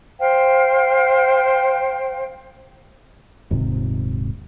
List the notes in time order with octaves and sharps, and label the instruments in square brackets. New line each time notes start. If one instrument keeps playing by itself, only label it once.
[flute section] C5 F5 G5
[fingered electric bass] D#1 G#2 C3